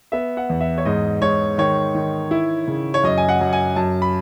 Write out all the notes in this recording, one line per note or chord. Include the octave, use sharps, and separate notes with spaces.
B3 E5
F#5
E2
E5
C#5
G#2 D#5
G#2 C#5
D#3 C#5
D#3
E4
C#3
C#5
F#2 D#5
G#5
F#5
F#2
G#5
F#2 A5
B5